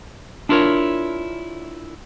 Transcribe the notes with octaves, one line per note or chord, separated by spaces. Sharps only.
D4 E4 F4 A#4 C#5